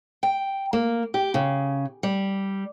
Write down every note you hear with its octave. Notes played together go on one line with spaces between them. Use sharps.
G5
A#3
G4
C#3
G3